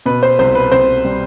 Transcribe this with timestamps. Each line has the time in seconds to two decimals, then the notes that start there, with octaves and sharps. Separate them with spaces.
0.06 B2 B4
0.23 C5
0.39 C2 C5
0.55 B4
0.71 C2 C5
1.04 G3